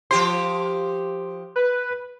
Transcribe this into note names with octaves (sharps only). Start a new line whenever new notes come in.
F3 G4 C5 C6
B4